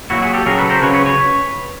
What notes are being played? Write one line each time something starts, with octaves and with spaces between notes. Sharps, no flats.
A#2 F#3 E4 F#4
F#4 G#4
G4 A4
C#3 F#3 G#4 A#4
A4 B4
A#4 C5
C#3 F#3 B4 C#5
B4 C#5
B4 C#5